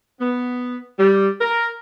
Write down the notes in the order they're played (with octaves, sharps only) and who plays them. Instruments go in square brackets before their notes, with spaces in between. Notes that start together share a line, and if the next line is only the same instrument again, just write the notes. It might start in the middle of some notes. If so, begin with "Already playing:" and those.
[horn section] B3
G3
A#4